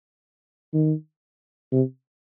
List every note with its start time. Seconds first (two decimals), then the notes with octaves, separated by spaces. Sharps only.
0.74 D#3
1.72 C3